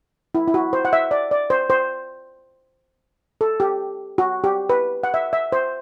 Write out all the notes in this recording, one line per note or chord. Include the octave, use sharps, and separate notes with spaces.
E4
E4
F#4
C5
F#5
E5
D5
D5
C5
C5
A4
G4
F#4
G4
B4
F#5
E5
E5
C5